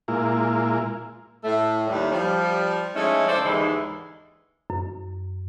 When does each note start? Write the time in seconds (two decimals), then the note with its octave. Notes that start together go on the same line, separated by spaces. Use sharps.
0.08 A#2 G#3 A#3 E4 F4
1.44 A2 A3
1.87 D#2 A2 G3
2.11 F3 G3
2.95 F3 G#3 A3 C#4 D#4 E4
3.28 C#3 A4 C5 D5
3.45 D#2 G#2 D3 E3 G#3 D#4
4.70 F#2